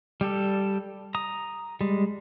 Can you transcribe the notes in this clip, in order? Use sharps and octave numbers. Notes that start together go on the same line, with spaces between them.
G3 G4 A4
A#5 D#6
G3 G#3